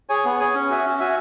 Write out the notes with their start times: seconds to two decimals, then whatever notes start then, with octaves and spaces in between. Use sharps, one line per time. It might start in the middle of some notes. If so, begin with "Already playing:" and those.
0.09 G#4 C#5 G#5
0.25 B3
0.40 G#4 C#5 G#5
0.54 C#4
0.70 F#4 E5 G#5
0.85 C#4
1.00 F#4 E5 G#5